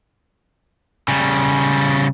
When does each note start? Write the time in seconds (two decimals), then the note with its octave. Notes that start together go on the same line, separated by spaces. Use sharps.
1.08 C#3 G3